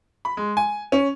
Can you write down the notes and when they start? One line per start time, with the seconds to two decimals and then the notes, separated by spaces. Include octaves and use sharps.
0.25 B5
0.37 G#3
0.57 G#5
0.92 C#4